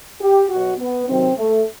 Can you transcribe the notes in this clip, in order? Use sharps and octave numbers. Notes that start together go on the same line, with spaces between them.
G4
B2 F#3 F#4
B3
C3 D#3 F#3 C4
A3